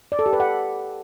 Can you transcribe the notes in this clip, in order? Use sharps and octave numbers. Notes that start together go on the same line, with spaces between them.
D5
A4
G4
B4
F#5